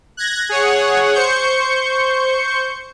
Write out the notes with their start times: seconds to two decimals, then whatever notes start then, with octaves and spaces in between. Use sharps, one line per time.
0.17 F#6 G#6 A#6
0.49 G#4 C#5 F#5
1.14 C5 C#6 G6 C#7